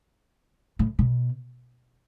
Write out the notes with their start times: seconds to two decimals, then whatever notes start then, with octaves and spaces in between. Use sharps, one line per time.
0.79 A2
0.99 B2